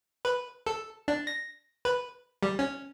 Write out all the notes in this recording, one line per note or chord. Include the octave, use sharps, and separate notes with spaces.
B4
A4
D4
A#6
B4
G3
C#4